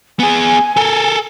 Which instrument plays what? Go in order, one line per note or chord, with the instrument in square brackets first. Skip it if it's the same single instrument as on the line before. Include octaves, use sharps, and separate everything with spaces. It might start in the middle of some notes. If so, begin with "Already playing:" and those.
[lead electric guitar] B3 G#4 [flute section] G#5
[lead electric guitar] A4 A#4